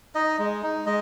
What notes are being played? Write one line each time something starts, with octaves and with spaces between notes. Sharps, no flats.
D#4 D#5
G#3
D#4
G#3 D#5